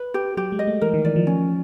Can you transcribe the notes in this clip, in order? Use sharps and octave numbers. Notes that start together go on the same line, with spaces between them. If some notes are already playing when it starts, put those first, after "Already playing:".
Already playing: B4
G4
F#3 G4
G#3
D#5
A3
E3 A#4
D#3
E3 D5
F3
C#4